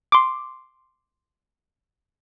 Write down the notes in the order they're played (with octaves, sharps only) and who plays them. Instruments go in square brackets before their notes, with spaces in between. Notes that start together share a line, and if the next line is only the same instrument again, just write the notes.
[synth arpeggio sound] C6 D6